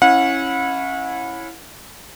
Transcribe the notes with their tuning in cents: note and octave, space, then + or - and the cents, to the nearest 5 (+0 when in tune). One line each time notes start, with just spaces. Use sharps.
C#4 -15 E4 +0 F#5 -35